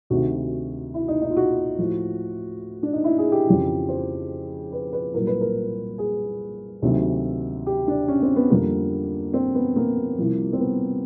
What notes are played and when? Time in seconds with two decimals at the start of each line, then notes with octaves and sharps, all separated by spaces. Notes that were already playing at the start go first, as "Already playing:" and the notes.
0.10 D2 C3 D#3 F#4
0.94 E4
1.08 D#4
1.22 D#4
1.30 F4
1.37 F#4
1.79 A2 F3
2.83 D4
2.93 D#4
3.04 E4
3.18 G#4
3.32 G4
3.47 F2 C#3 E3
3.89 C5
4.72 B4
4.93 B4
5.14 C2 A#2 F#3 A#4
5.27 B4
5.41 A#4
5.98 G#4
6.82 D2 C3 D#3 F#3
7.66 G4
7.88 D4
8.08 C#4
8.22 C4
8.36 B3
8.50 F2 D3 G3 A#3
9.34 C4
9.55 B3
9.76 A#3
10.18 C2 C3 F3
10.53 C4
10.60 B3